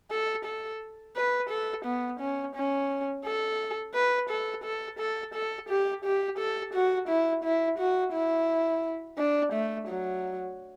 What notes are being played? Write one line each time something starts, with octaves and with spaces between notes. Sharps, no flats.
A4
A4
B4
A4
B3
C#4
C#4
A4
B4
A4
A4
A4
A4
G4
G4
A4
F#4
E4
E4
F#4
E4
D4
A3
F#3